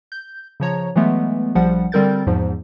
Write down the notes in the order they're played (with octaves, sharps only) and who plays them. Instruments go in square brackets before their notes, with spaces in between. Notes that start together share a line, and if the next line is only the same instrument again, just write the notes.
[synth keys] G6
C#3 F3 C#5 A#5
E3 F#3 G#3 A3 B3
A#1 F3 G3 F#5
D3 G3 C4 A#4 G6 A6
E2 G#2 F3